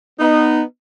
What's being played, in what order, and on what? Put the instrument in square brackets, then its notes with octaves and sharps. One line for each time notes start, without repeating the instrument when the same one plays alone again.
[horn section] B3 D#4